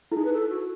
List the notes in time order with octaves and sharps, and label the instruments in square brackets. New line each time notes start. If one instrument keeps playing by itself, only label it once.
[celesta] E4 [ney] A4
[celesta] D#4 [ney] G#4
[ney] B4
A4
F#4